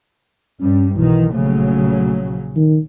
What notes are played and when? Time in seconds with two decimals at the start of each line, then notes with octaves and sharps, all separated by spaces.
0.61 G2 G3 C#4
0.96 B1 D#3 E3
1.33 A#1 C#3 F#3 A3
2.56 D#3